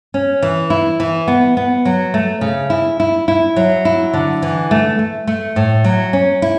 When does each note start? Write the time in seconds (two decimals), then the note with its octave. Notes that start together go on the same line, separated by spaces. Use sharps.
0.14 C#4
0.42 E3
0.70 E4
1.00 E3
1.28 B3
1.57 B3
1.85 F#3
2.14 A3
2.41 C#3
2.70 E4
3.00 E4
3.28 E4
3.56 F#3
3.85 E4
4.13 D3
4.42 E3
4.71 A3
4.99 A3
5.27 A3
5.56 A2
5.84 F#3
6.13 C#4
6.42 E4